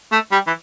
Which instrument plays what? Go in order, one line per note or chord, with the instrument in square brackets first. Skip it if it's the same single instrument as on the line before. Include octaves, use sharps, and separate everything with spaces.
[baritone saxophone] A3
G3
E3